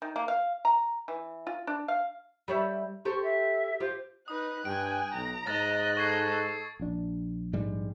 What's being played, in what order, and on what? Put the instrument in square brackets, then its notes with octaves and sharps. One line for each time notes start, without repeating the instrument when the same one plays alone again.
[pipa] D#3
A#3
F5
A#5
E3
F4
D4
F5
[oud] G3 C#5 E5
[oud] G4 A4 C5 [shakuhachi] C#6
[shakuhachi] E5
[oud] F4 G4 [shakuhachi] C5
[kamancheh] D#4 B4 [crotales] D#6 [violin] F#6
[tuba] G2 [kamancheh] G5 G#5 [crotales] D7
[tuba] B1 [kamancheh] A#5
[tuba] G#2 [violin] D#5 F#6 [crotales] A6
[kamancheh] A4 [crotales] C#6 G#6 C7
[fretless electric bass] A#1 D4
[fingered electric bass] G#2 G3 G#3